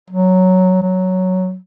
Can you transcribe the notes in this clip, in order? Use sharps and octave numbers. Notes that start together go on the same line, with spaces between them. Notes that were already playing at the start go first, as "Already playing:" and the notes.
F#3
F#3